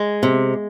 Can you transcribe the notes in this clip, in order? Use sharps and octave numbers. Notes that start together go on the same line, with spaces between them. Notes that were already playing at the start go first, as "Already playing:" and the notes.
Already playing: G#3
C3